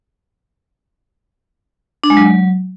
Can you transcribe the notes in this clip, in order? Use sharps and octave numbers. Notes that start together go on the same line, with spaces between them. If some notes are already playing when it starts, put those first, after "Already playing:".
D4
G#3
F#3